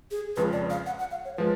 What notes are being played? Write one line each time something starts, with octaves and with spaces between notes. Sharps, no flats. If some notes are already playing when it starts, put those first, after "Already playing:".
G#4
F2 C#3 F3 G#3 B4
D5
F5
F#5
F#5
F5
C#5
F3 G#3 B4